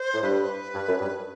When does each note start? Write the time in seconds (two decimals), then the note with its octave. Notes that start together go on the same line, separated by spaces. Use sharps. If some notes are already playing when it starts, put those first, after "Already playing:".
Already playing: C5
0.14 A2
0.22 G2 B4
0.75 G2
0.88 F#2
1.00 G2